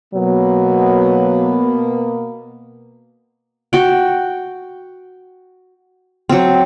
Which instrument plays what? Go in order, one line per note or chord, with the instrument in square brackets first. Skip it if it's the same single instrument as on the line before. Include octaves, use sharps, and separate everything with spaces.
[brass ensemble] B2 A#3 B3 [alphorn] F#3
[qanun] F#4 G5
F#3 C4